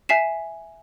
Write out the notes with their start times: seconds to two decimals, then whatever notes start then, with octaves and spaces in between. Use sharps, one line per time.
0.09 E5 G#5 B6 C7 E7